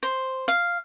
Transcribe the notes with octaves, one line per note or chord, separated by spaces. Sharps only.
C5
F5